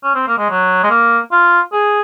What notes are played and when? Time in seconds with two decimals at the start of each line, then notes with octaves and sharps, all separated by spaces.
0.04 C#4
0.15 C4
0.28 A#3
0.38 G#3
0.50 F#3
0.83 G#3
0.90 A#3
1.32 F4
1.73 G#4